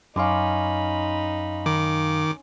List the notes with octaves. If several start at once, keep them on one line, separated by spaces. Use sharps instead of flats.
F#2 C#4 D#4 F5 B5 C6 D6
D#3 D6